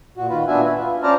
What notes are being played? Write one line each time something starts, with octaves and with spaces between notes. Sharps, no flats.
A#2 F#4
D#3 F4 B4
A#2 B3 D4 F#4 E5 G#5
B4
F4
C#4 C5 D5 A5 A#5 F6